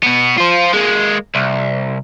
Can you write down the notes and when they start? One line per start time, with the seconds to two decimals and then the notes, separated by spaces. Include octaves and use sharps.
0.03 B2 B3
0.38 F4 C5
0.74 G#3 A#3
1.35 C2